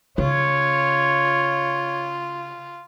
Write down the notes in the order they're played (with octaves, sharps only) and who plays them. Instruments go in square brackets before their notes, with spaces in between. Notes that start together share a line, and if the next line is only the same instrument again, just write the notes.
[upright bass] C#3 [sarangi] F4 [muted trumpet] C#5